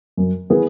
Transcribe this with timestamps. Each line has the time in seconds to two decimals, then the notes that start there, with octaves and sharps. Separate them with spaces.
0.17 F#2
0.50 E3 B3 E4 G#4